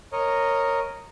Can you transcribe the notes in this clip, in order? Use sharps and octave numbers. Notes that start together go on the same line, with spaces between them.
A#4 C#5 D#5